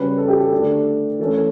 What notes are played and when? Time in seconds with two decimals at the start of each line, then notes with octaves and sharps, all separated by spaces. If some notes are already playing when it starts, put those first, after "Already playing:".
Already playing: C#3 G3 C#4 B4
0.18 A4
0.28 G4
0.39 A4
0.51 D3 A3 D4
1.19 E3 A3 C#4